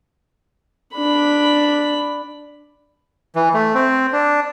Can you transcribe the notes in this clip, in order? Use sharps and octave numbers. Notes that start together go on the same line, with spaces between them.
D4 B5
E3
A3
C4
D4